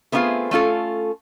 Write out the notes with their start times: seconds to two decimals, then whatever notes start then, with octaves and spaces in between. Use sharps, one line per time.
0.12 A3 B3 C4 D#4 F4 G#4
0.51 A3 C#4 F4 A4